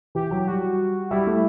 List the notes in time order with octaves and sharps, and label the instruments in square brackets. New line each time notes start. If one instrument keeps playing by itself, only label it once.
[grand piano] E3 [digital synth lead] G4
[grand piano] F#3
[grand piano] G3 [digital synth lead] F#4
[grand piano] G3 [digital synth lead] E4
[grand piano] A3